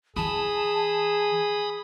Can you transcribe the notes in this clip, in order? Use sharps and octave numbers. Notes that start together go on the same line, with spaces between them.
E3 G#4 A5 B5 D#6